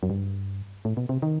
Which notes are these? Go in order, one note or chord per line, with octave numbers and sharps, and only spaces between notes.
F#2
G2
A2
B2
C3
D#3